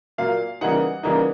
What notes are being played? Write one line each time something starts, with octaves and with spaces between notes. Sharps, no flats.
A#2 F#3 A#3 F5
C#3 E3 G3 A#3 D#4 F#5
C#3 E3 G3 A#3 D#4